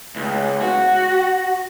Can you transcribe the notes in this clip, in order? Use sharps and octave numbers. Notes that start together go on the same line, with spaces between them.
C#2
F#4